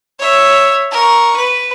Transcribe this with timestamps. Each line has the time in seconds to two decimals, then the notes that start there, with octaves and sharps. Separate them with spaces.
0.19 C#5 E5
0.91 A#4 C#6
1.36 B4